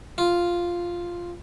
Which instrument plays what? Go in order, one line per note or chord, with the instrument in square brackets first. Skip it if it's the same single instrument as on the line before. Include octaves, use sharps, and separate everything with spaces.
[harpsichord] F4